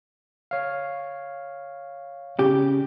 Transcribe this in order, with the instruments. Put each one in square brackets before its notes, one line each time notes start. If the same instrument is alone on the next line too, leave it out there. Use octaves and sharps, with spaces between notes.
[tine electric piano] C#5 F5
[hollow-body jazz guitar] C#3 G4